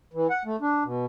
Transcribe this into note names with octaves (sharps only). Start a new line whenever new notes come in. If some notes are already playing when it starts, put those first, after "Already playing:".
E3
F#5
A3
D4
B2